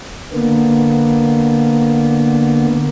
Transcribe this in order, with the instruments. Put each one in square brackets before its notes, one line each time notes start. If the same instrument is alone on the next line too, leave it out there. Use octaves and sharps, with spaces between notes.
[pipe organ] D3 A#3 B3